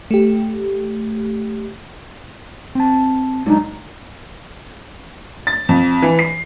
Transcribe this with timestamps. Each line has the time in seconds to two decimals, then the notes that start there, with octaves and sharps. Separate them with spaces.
0.11 A3 G4
2.75 C4 A5
3.46 F#3 G#3 D4 D#4
5.47 A6
5.69 F2
6.02 E3
6.19 C7